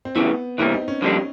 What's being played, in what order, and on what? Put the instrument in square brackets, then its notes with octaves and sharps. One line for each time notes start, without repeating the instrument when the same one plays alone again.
[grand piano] C4
[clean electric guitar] D2 C#3 E3 [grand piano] B3
[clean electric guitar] C3 E3 G3 A#3 [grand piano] C4
[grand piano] D#4
C#4
[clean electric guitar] F2 D3 G3 A#3 D4